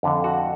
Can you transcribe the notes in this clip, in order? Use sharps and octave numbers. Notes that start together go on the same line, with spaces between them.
F2 D3
F#4